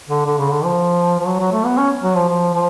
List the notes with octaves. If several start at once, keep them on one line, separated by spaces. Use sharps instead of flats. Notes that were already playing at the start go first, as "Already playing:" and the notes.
D3
D3
C#3
D3
F3
F3
F#3
F#3
A3
B3
C#4
F#3
F3
F3
F3